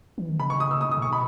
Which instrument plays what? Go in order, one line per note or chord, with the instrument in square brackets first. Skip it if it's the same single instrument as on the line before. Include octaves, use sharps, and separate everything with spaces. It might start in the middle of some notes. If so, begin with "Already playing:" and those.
[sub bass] E3
D#3
[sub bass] C#3 [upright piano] B5
[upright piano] C#6
D#6
E6
D#6
D#6
[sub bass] A2
[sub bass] B2 [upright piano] C#6
[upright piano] B5